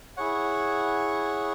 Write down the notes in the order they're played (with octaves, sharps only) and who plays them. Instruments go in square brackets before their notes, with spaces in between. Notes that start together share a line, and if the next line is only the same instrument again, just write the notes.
[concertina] E4 G#4 C#5 F#5